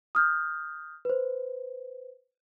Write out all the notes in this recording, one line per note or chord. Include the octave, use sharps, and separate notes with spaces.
D#6 F6 G6
B4 C5